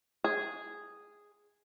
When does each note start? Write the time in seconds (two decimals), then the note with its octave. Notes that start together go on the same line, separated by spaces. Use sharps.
0.24 G#4